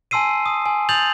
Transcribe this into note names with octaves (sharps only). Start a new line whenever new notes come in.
G#5 A5 C6 E6 C7 D#7
D#6
G#5
D#6 G6 A6 F7 F#7